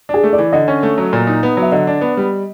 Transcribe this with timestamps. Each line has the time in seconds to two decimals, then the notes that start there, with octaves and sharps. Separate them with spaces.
0.09 D4 G#4
0.23 A3
0.33 D5
0.38 E3
0.53 D3 D#5
0.68 C#4
0.83 A3
0.98 F#3
1.13 A#2
1.27 D#4
1.43 B3
1.57 F#3
1.62 E5
1.72 D3 D#5
1.87 D4
2.01 B3
2.17 G3